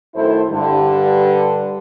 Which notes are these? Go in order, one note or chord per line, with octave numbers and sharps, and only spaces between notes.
F#2 D#3 A3 E4 A4 C5
G2 D3 G3